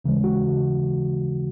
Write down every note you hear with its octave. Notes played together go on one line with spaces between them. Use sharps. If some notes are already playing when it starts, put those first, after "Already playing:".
D#2 C#3 E3 G#3
F#4